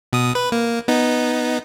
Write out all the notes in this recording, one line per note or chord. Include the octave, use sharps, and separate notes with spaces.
B2 D#6
B4
A#3
B3 D#4